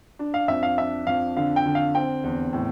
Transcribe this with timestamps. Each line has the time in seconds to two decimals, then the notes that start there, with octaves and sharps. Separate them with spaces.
0.19 D4
0.34 F5
0.48 F2 E5
0.63 F5
0.78 D4 E5
1.07 F2 F5
1.37 D3 F5
1.56 G5
1.66 D3
1.75 F5
1.95 C4 G5
2.24 E2
2.53 A2